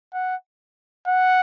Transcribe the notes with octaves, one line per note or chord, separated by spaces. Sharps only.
F#5
F#5